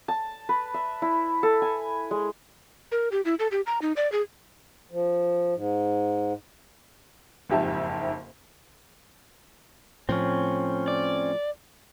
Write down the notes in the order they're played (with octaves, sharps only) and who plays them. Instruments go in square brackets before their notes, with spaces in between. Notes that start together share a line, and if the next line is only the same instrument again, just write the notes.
[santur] A5
B4
E5
E4
A4
G#5
G#3
[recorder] A#4
G4
E4
A4
G4
A#5
D#4
D5
G#4
[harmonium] F3
G#2
[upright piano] F#1 F2 G#2 G4 E5 A5
[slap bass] A2 F3 [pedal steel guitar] C4 C#4
[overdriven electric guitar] D5